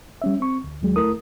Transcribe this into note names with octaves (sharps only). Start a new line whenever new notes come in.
G3 C#4 E5
C4 C#6
D2
D#2 F#3 G#3
D2 A3 E4 A4 A#4 D#6